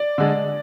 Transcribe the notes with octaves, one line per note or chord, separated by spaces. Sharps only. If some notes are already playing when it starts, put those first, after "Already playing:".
Already playing: D5
D3 G#3